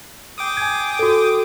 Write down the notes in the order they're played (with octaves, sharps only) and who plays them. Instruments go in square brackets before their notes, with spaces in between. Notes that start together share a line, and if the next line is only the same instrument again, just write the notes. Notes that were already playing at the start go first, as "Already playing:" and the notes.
[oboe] G#4 [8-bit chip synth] G5 D6 D#6
[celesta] G#5 G#6
F#4 A4